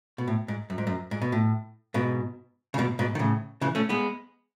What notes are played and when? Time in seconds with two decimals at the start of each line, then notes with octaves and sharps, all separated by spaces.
0.18 B2
0.27 A2
0.48 G#2
0.70 F#2
0.78 G#2
0.87 F#2
1.11 G#2
1.22 B2
1.32 A2
1.94 G#2 B2
2.74 C#3
2.78 G#2 B2
2.99 G#2 B2
3.15 D#3
3.19 A2 C#3
3.61 C#3 E3
3.75 A3 C#4
3.89 G#3 B3